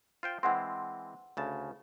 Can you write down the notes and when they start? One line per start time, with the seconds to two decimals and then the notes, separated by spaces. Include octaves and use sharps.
0.23 F4 C5 G5
0.43 E3 G#3 C4 F#5 C6
1.37 D2 C#3 A5